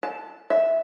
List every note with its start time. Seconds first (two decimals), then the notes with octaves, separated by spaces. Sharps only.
0.03 A5
0.50 E5